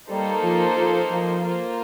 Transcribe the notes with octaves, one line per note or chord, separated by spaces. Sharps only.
G3 A#3 D#4 A4 C5
F3
F3
F3
A#3 F4 C5